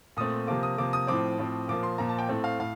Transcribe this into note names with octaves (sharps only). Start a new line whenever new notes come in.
A#2 A3 C4 D#6
C3 F3 A#3 D6
D#6
C3 F3 A#3 D6
D#6
A2 F3 C4 D6
A2 F3 C4
A#2 F3 A#3 D6
C6
A#2 F3 A#3 A#5
A5
G5
A2 A3 C4
F5
A2 F5